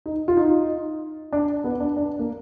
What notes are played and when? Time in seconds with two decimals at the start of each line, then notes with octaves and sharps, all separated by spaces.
0.06 D#4
0.28 F4
0.37 D#4
1.32 D4
1.64 B3
1.80 D4
1.96 D4
2.19 A#3